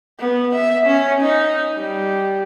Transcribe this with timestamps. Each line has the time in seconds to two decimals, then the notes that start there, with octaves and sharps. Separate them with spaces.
0.19 B3
0.55 E5
0.86 C#4
1.21 D#4
1.75 G3